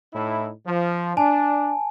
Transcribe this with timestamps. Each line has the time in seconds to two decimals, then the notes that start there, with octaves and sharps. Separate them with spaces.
0.13 A2 D#4 E4
0.66 F3
1.17 D4 G#5 A5